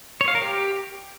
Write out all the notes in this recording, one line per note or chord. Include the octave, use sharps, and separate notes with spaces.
C#5
F5
A#4
G4